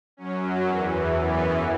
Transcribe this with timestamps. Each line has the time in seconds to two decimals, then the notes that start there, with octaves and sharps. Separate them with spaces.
0.17 F#2 F#3 C#4
0.65 E2 E3 C#4
1.13 F#2 E3 B3